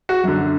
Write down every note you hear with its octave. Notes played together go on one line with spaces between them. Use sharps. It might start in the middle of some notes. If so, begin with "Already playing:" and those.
F#4
F#2 D3